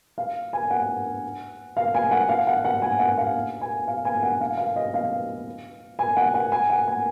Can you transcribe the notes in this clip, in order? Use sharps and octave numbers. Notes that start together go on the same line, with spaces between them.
F5
G#5
F#5
F5
G#5
F#5
F5
F#5
F#5
G#5
F#5
F5
G#5
F5
G#5
F#5
F5
F5
D#5
F5
G#5
F#5
F#5
G#5
F#5
G#5